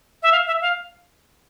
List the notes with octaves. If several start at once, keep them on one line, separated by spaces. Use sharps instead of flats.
E5
F5
E5
F5